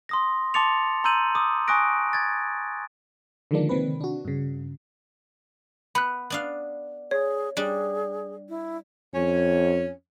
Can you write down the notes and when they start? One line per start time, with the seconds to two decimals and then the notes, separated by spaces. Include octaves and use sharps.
0.09 C6 D#6 A#6
0.54 A5 C6 D6 A6 C#7 F7
1.04 A#5 C6 E6 G6 D#7 F#7
1.35 D6 D#6
1.68 G#5 C#6 D#6 F#6 A#6 D7
2.13 G#6 A6
3.51 D3 D#3 F3 G#3 A#3 D4
3.69 C3 D#3 C4 B4
4.01 D4 F#4
4.25 G2 C#3
5.95 B3 B5 F#6
6.30 B3 D4 F5
7.11 G#4 C#5
7.57 G3 D4 G#4
8.49 E4
9.14 F2 C#4 C#5